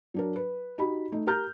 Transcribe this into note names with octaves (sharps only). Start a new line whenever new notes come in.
F#3 D4 A#4
B4
D#4 F#4 G4 B5
A3 D#4
G4 A#4 A#5 F6 G6